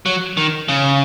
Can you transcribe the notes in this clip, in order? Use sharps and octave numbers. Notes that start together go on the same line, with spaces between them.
F#3
D#3
C#3